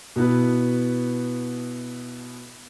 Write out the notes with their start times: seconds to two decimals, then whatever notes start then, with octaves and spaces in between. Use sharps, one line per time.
0.16 B2 B3 E4 B4